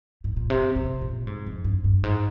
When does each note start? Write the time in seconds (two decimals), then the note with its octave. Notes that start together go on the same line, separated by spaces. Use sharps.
0.24 G#2
0.36 A#2
0.50 C3
0.76 C3
1.01 A#2
1.27 G#2
1.46 F2
1.64 G2
1.84 G2
2.03 G#2